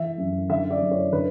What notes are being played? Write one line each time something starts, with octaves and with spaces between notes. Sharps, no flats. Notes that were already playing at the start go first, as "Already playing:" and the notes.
Already playing: E3 E5
F#2
D3 E5
D5
F#2
C#5
D3 B4